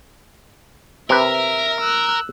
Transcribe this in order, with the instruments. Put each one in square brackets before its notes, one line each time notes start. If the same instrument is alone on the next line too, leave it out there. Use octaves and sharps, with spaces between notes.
[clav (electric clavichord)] C3 B4 [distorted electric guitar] A#4 [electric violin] E5
[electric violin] E6 F#6